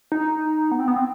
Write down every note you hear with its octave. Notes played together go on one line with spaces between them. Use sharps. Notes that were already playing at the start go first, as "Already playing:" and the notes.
D#4
B3
C4
B3
C4